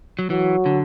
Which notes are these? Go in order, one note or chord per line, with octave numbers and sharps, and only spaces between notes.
F#3
E3 F#3
D3